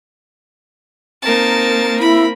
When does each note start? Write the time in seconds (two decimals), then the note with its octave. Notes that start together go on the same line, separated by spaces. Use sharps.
1.23 A#3 C4 D#4 A#4 A5
2.00 E4 B5